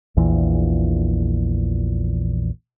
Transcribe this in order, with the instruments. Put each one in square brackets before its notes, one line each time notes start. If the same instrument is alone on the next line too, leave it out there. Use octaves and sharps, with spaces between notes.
[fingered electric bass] A#1 E2 A#2 E3